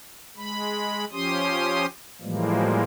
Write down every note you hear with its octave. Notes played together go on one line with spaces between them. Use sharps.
G#3 B5
F3 C#4 G4 C6 D#6
A2 E3 F3 G3 G#3 A#3